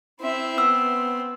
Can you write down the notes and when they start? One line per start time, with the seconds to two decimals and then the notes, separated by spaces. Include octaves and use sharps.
0.21 C4 E4 E5
0.58 B3 E6